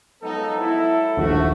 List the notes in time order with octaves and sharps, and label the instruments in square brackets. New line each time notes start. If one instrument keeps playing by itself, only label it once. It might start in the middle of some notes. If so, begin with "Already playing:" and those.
[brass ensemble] F3 B3 D#4 [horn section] F#3 G#3 A4
[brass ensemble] E4
[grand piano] D#1 A#1 [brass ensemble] A3 F#4